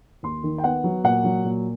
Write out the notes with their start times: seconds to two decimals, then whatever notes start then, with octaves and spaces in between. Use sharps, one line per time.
0.23 D#2 C6
0.43 D#3
0.58 G5
0.63 B3 F#5
0.84 F#3
1.04 A#2 F#5
1.24 F#3
1.44 A#2